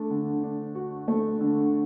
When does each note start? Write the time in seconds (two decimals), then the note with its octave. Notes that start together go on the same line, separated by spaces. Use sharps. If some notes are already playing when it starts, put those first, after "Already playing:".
Already playing: A3 D4
0.10 D3
0.43 D4
0.75 F#4
1.08 A3
1.41 D3